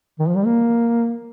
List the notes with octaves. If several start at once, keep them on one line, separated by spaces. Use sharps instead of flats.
D#3
F3
G3
A#3